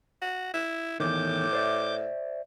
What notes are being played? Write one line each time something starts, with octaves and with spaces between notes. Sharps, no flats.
F#4
E4
E2 A2 D#3 D6 G6
C5 D5 E5